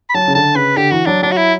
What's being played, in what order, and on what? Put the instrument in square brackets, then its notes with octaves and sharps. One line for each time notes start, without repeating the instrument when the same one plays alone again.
[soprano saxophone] B5
[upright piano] F#3 [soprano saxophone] A5
[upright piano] C#3
[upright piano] D3 [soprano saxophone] A5
[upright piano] C#3 [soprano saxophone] B4
[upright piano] D3 [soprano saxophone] G4
[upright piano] E3 [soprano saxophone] F#4
[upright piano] F#3 [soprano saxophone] D4
[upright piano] F#3 [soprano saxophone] D4
[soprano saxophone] F#4
E4